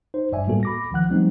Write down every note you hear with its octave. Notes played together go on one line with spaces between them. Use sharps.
D#4 C5
G1 G2 D5 E5 G#5
A2 G3 A#3 B3 F#4 A4
B5 D6 A#6
D2 D#3 F3 F#5 F#6
F3 G3 A3 B3 C4 D#4